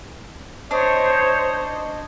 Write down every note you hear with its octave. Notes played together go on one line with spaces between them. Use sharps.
D4 C5 C#5 D#5